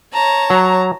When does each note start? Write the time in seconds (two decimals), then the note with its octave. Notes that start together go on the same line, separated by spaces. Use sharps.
0.13 C#5 A5 A#5
0.50 F#3